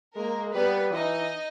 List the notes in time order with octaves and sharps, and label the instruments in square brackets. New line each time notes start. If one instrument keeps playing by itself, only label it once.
[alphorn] G#3 [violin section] A#3 A#4
[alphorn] G3 [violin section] B3 B4
[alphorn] E3 [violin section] D#4 D#5